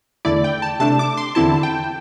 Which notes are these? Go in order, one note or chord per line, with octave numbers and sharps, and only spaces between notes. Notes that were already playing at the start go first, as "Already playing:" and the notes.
E2 D3 A3 E4 D5
G5
A5
C3 A3 D4 A5
D6
C6
E2 D3 C4 E4 A5
G5